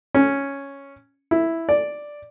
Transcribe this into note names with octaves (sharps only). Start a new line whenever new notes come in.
C#4
E4
D5